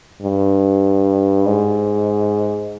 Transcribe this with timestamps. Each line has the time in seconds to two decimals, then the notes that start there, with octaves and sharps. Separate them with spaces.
0.22 G2
1.46 G#2